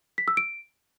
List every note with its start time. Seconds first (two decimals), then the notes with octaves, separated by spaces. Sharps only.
0.18 B6
0.28 E6
0.37 D7